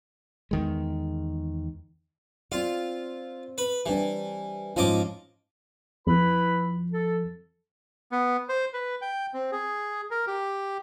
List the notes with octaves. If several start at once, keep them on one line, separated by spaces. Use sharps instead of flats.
E2 D#3 G#3
C4 F4 D5
B4
E3 G3 C4 D4
G#2 F3 C#4 F4 D#5 D6
F2 E4 B4 B5
A4
B3
C5
B4
G5
C4
G#4
A#4
G4